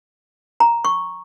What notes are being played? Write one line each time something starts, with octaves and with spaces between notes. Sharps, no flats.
A#5
C#6